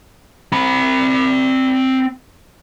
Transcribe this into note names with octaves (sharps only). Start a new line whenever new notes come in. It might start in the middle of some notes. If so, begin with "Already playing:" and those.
C4 B5